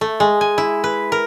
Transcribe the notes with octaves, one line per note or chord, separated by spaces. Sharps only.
A3
G#3
G#5
E4
B4
A#4